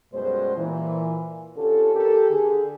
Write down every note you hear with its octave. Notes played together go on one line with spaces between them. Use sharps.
F#2 B2 G3 G#3 C5
A#2 E3
D3 C#4 F4 G4 A4
G4 A4 A#4
D3 G#4